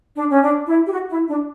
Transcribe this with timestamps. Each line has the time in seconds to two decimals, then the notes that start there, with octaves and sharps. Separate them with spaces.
0.16 D4
0.30 C#4
0.42 D4
0.67 E4
0.86 G4
0.91 F#4
1.09 E4
1.29 D4